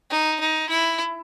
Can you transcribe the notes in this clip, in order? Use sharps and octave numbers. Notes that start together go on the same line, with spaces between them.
D#4
D#4
E4